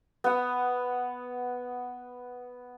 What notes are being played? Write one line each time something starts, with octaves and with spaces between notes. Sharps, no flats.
B3 F#5